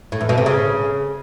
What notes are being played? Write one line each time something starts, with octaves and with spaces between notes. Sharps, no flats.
A2
E2
B2
C3
C#3